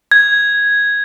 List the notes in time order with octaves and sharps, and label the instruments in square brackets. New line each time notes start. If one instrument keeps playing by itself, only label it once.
[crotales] G#6